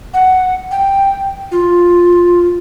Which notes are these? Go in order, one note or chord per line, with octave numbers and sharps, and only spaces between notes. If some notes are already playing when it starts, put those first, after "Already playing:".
F#5
G5
F4